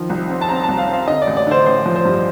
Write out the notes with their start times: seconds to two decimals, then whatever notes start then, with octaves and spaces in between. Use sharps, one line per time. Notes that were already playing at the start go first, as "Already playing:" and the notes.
Already playing: D#3 F3
0.10 C2
0.29 C4
0.41 A5
0.48 C4 A#5
0.63 C2 A5
0.78 F5
0.88 C4
0.93 F5
1.07 D3 D#5
1.22 D5
1.27 A1
1.37 D5
1.47 D3 C5
1.66 A1 C5
1.86 F3
1.96 C5
2.05 G2